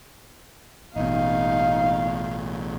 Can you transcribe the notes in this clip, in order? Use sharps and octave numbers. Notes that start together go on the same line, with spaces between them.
A1 B2 D#4 F5